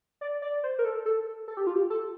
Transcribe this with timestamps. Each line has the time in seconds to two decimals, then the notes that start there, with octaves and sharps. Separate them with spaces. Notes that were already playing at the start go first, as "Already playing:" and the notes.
0.21 D5
0.42 D5
0.64 C5
0.79 A#4
0.85 A4
1.06 A4
1.48 A4
1.57 G4
1.67 F4
1.76 G4
1.90 A4